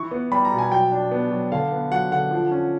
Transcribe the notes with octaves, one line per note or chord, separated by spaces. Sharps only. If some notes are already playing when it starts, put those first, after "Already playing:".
Already playing: E3 E4 C#6
B3
G3 B5
A#5
B2
G#5
F#3 G5
D4
B3
F#3
D3 F5
B3
F#3 F#5
D3 F#5
F3
C#4